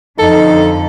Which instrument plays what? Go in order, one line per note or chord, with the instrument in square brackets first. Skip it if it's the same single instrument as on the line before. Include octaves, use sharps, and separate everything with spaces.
[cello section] F2 D3 [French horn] D#4 [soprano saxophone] A4